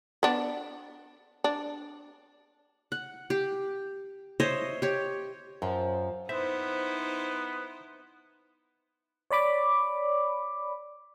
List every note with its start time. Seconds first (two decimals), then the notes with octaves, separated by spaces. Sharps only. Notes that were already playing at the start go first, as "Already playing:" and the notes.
0.23 B3 D4
1.44 D4
2.92 F#5
3.30 G4
4.40 C5 C#5 D#5 E5
4.82 G4 C#5
5.62 F#2 F3
6.29 B3 C4 D#4 E4 C5 E5
9.31 C#5 D5 B5 D6